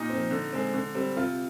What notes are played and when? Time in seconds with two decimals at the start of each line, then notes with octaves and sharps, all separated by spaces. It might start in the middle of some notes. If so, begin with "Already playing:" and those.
Already playing: A#2 D#4
0.10 F3 C4
0.31 D3
0.53 G#3 C4
0.74 D3
0.95 G3 C4
1.16 C3 F4